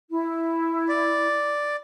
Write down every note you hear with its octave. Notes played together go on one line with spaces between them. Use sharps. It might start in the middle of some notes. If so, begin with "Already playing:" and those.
E4
D5